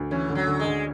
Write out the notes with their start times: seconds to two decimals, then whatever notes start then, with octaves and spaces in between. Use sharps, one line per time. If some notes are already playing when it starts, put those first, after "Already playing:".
Already playing: D2
0.11 E3 C#4
0.30 D3
0.35 F#3
0.47 D3
0.59 G#3
0.65 D3